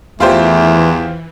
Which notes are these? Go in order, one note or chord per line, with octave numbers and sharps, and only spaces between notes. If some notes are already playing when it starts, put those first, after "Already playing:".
E2 E3 A3 F4 G4 C5